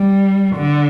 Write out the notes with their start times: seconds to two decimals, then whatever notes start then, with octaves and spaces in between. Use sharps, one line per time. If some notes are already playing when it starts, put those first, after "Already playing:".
Already playing: G3
0.55 D3